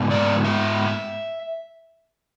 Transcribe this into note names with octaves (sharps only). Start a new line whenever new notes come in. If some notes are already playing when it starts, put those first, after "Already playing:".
Already playing: G#2 G#3 B3
D5
E5